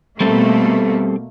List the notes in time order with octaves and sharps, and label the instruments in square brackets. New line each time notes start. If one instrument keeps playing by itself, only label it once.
[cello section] B2 A3 A#3 [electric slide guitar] G3 C4 A4